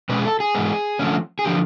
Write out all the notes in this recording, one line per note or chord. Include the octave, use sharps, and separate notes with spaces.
B2 G#3 C#4 B4
G#4
A4
G#4
G#2 E3 G#3 B3
D3 F3 A3 C#4
G#4
D3 F3 G4